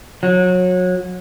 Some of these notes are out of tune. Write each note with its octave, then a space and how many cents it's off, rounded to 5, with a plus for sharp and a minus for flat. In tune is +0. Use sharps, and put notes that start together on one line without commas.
F#3 -25